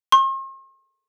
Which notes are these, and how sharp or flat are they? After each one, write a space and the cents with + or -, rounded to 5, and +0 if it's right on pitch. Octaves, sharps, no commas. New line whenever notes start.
C6 +45